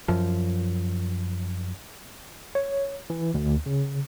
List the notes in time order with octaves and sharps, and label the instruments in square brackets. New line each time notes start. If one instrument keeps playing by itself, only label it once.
[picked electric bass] F#2 F3
[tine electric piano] C#5
E3
D2
C#3